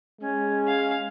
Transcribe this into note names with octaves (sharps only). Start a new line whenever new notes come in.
G#3 C#4
F5